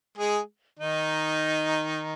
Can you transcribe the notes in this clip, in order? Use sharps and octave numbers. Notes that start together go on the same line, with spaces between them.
G#3 G#4
D#3 D#4